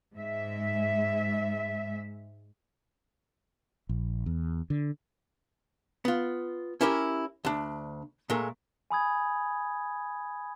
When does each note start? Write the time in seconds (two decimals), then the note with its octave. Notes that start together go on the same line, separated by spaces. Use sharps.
0.15 G#2 G#3 E5
3.89 A#1
4.26 E2
4.70 D3
6.05 B3 F4
6.81 C#4 E4 G4 A#4 B4 C#5
7.45 D2 D4
8.30 A#2 G#3 A3 A#4
8.91 G#5 B5 D#6 G#6